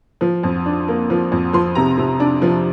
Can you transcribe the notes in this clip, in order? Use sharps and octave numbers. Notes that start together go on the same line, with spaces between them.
F3
F2
D4
A#3
F3
F2
F3 C6
C3 A#5
C3
D4
F3